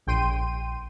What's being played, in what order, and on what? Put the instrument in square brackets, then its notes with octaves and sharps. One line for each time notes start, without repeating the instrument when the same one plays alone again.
[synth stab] A#1 G5 C6 D#7